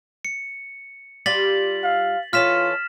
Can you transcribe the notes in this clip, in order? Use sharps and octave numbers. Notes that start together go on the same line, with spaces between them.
C#7
G3 F4 G4 A6 B6 F#7
F5
E3 C#4 F4 A4 F6 B6 E7